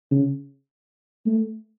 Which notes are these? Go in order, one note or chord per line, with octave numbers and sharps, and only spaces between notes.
C#3
A3